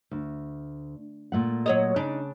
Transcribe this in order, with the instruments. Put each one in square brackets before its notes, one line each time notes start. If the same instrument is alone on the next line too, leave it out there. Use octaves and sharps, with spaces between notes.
[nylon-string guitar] D2
A#2 A3 F#5
[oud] F#3 C#5 D#5
[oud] C#3 D4 [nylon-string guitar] D#4